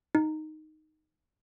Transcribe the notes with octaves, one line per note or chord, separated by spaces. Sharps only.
D#4